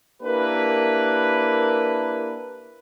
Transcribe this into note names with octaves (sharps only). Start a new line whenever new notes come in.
A#3 D4 E4 G4 A#4 B4